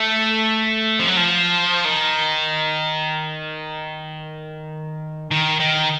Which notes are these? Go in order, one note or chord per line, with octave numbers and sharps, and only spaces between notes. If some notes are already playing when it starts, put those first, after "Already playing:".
Already playing: A3
F3
F#3
F3
D#3
D#3
D#3